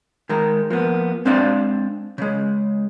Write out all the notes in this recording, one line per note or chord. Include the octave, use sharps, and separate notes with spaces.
D#3 G#3 A#4
F3 A#3 B3
G#3 C4 D4 C5 D5 F5
C#3 G#3